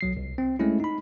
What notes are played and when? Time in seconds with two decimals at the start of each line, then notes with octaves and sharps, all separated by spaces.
0.01 B1 F#3 C7
0.17 C2
0.38 C4
0.59 G#3 A3 C#4 E4
0.80 D#4 B5